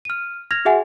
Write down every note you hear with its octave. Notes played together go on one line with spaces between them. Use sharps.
F6 D#7
F6 G#6 A#6 F7
F#4 G#4 E5 F#5 G#5